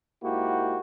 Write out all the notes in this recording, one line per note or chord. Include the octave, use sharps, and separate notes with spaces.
G#2 A#3 E4 F#4 G4